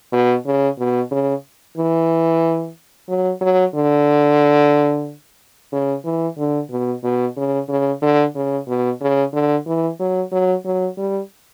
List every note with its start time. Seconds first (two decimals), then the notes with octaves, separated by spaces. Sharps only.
0.12 B2
0.46 C#3
0.78 B2
1.11 C#3
1.77 E3
3.09 F#3
3.41 F#3
3.74 D3
5.72 C#3
6.05 E3
6.37 D3
6.70 B2
7.03 B2
7.36 C#3
7.69 C#3
8.02 D3
8.35 C#3
8.68 B2
9.01 C#3
9.33 D3
9.66 E3
9.99 F#3
10.32 F#3
10.65 F#3
10.97 G3